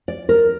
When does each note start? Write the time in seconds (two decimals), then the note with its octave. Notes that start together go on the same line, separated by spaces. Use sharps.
0.08 D5
0.29 A#4